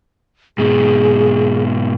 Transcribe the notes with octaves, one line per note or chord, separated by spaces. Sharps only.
G#2 B2 G#4